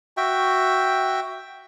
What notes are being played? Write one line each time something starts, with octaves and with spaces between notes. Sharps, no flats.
F#4 E5 G5